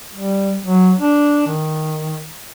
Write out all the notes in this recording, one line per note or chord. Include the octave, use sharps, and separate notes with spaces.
G3
F#3
D4
D#3